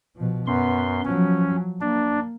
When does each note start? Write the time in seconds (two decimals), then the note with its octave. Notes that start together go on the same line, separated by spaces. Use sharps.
0.16 B2 F3
0.47 F#2 B3 C6
1.05 F3 F#3 C#4
1.81 A#3 D4